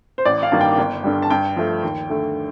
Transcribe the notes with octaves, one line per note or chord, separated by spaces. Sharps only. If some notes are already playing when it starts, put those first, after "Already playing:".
C5
A1 D5
F5
G2 D#3 G3 A#3
G5
G1
G2 D3 G3
A5
G2 G5
F3 A3
D#2
D3 A3